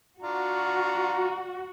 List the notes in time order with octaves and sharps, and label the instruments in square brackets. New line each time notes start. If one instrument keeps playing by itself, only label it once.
[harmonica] D4 F4 A#5 [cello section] F#4